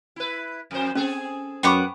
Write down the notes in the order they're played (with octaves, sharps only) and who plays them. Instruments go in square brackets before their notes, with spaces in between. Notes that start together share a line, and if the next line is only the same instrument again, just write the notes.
[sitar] E4 B4
F2 C5
[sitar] C4 G#4 A4 [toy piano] C#4
[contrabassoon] F#2 [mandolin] B3 F#5 D6 [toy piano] G5 B5 C#6